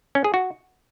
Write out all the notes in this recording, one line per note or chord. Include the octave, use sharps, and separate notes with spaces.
C#4
G#4
F#4